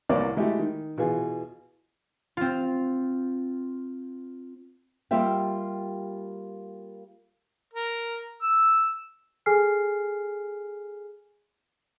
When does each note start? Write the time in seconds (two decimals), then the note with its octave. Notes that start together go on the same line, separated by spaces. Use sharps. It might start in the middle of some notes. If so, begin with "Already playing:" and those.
0.09 C2 C3 A#3 B4 C#5 D5
0.37 G#3 A3 E4 F#4 G4
0.59 D#3
0.98 B2 E3 F4 G#4
2.37 C4 F4
5.11 G3 A#3 F4 G4 E5 G5
7.73 A#4
8.42 E6
9.46 G#4 A4 G#5 F6 C7